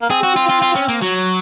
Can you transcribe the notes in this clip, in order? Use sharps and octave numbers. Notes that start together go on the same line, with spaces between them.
A#3
C4 G#4
F#4
F4
F4
F4
C#4
A#3
F#3